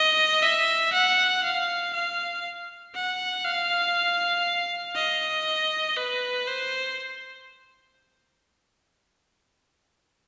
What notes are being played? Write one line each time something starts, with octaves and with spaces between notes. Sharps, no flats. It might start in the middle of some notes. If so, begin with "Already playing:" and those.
Already playing: D#5
E5
F#5
F5
F5
F#5
F5
D#5
B4
C5